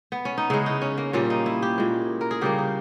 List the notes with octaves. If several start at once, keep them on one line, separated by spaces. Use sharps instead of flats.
B3
C#4
D#4
C#3 G#3 E4
D#4
C#4
A#3
A#2 G3 A#3 C#4
D#4
E4
G4
A#2 G#3
A#4
G#4
C#3 G3 A#3 G4
A#4